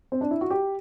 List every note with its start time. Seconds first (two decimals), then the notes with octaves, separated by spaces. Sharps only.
0.12 C4
0.21 D4
0.31 E4
0.41 F#4
0.50 G4